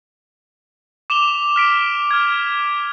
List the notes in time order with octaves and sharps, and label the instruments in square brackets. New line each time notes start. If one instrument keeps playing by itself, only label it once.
[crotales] D6 E7 F7 G7
F6 B6 D7
F6 G#6